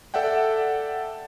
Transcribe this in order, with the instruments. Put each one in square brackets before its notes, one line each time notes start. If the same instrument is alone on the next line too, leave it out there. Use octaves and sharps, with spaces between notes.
[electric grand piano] A4 D5 E5 F#5 G5